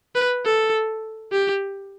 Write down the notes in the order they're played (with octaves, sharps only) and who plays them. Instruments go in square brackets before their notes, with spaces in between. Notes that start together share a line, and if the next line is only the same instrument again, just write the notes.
[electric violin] B4
A4
G4